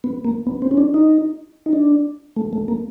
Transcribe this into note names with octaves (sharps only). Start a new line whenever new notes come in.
B3
A#3
B3
C4
C#4
D4
D#4
D#4
D4
A3
A3
A#3